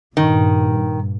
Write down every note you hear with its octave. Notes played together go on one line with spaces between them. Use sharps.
G2 A#2 D#3